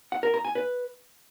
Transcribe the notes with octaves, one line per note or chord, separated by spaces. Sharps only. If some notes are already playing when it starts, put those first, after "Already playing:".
F#5
A#4
A#5
G#5
B4